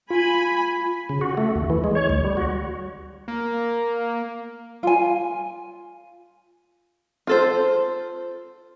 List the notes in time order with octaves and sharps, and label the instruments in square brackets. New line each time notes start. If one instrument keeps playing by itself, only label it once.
[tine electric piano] F4 [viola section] G#5 B5
[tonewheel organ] C#3
F#4
A3
D#2
E3
G#3
C#5
D2
G3
F#4
[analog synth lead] A#3
[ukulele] F4 G#5
[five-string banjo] F4 A4 C5